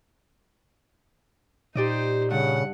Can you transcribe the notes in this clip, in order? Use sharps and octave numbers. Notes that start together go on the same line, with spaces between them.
A#2 D#4 G4 C5 D5 D#5
G2 C#3 F#5